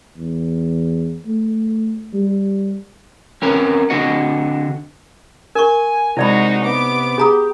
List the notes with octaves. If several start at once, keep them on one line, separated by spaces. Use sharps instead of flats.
E2
A3
G3
C4 C#4 A#4 B4
D3 C4 F#4 D#5 F#5
A#4 G#5 C#6
C3 G#3 D#4 E4 F#4 D5 B5
B3 D6
G4 G#4 A#5 D#6